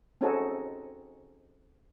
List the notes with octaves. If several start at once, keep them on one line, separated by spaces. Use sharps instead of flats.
C4 C#4 D#4 F#4 G#4 A4